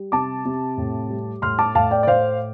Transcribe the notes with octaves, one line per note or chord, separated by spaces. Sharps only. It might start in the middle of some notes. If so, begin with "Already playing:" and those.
Already playing: G3
C3 A5 D6
C3
A2
G3
A2 C6 F6
A5 D6
A2 F5 A5
D5 G5
D5
A2 C5 F5